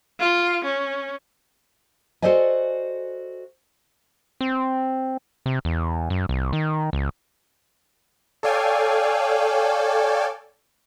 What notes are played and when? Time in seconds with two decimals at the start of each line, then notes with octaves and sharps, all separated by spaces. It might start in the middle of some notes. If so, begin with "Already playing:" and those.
0.19 F4
0.64 C#4
2.22 F#4 A4 C5 D5 D#5 G#5
4.41 C4
5.46 C3
5.65 E2
6.10 F#2
6.29 C2
6.53 D#3
6.93 C#2
8.43 A4 C#5 D5 F5 G5 G#5